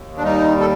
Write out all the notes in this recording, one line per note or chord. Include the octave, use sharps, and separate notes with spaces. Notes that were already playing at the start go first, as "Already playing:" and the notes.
Already playing: D#2
D4
G3 D#4
A4